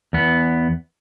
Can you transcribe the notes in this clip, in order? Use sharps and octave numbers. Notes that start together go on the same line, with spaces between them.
E2 B3